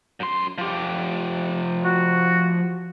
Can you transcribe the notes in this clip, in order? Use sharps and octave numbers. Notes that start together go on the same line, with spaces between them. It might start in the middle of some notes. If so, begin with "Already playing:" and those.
F#2 C6
F3 G4
F#4